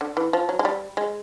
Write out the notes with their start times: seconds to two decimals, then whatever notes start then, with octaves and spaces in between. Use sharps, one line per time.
0.01 D3
0.17 E3
0.33 F3
0.49 F#3
0.59 G#3
0.65 G3
0.97 G#3